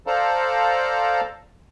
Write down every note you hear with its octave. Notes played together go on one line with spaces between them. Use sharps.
A4 C5 D5 F5 A5 A#5